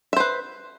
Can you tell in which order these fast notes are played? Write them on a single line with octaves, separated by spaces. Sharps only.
E5 C5 B4